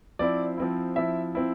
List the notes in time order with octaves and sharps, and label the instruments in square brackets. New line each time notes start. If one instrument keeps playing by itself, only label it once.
[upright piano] F3 C4 E4 D5
F3 C4 E4
F3 C4 E4 E5
F3 C4 E4